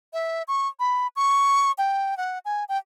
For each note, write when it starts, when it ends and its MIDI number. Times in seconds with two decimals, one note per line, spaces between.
0.13 0.43 76
0.48 0.68 85
0.80 1.07 83
1.16 1.72 85
1.78 2.17 79
2.17 2.39 78
2.45 2.64 80
2.69 2.78 79